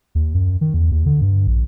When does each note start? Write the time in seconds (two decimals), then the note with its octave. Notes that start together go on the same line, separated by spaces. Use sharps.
0.15 D#2
0.34 F#2
0.61 D#3
0.74 E2
0.91 D#2
1.06 D3
1.21 G2
1.47 A#1